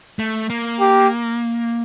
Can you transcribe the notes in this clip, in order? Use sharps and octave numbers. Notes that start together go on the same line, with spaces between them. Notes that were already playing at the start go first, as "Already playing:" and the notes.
A3
A#3
G4